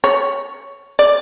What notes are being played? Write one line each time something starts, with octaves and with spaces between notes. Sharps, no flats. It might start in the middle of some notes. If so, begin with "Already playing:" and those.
C#5
D5